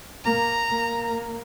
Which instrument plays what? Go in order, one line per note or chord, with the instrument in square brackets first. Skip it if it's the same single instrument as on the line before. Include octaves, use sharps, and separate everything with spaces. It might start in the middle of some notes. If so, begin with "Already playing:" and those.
[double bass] A#3 [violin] A#5
[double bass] A#3